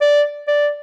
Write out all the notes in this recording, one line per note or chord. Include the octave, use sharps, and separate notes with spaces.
D5
D5